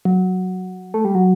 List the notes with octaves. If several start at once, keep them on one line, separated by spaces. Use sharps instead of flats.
F#3
A3
G3
F#3